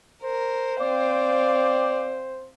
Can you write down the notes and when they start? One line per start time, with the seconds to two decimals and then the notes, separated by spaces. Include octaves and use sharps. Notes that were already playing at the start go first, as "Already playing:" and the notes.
0.22 A#4 C5
0.80 C4 D5 F5 G5